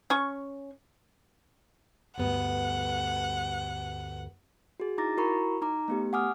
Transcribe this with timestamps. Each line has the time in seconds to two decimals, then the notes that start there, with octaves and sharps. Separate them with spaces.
0.10 C#4 C#6
2.18 D2 G2 B3 F#5
4.80 F#4 G#4
4.98 D#4 E4 A#5 D6 A6 A#6
5.17 E4 F#4 A#4 A#5 B5 C#6
5.62 D#4 A#5 D6
5.88 A3 B3 G4
6.13 F#5 G#5 D6 D#6 F6